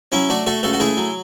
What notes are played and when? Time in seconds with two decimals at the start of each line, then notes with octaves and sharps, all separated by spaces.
0.12 F#3 C#4 E4
0.29 A3 D4 F#4
0.46 A3 F#4 A4
0.63 C#2 F#4 A4
0.73 F#4
0.80 A3 E4 G#4
0.97 F#3